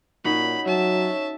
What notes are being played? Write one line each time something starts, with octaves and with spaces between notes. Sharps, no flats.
A#2 C#4 D#4 F#4 B5
F#3 C#5 E5 A5